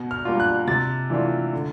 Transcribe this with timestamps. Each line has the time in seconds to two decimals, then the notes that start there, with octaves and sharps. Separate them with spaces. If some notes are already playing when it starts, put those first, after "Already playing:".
Already playing: B2
0.11 F6
0.25 G3 A#3 D4 F4
0.40 F#6
0.67 C3 A6
1.10 E3 A3 D4 F4
1.53 D3